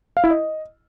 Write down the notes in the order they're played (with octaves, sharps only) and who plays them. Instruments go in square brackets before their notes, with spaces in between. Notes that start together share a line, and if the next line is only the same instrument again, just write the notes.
[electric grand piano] F5
E4
D#5